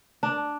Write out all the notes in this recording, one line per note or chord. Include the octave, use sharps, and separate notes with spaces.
D4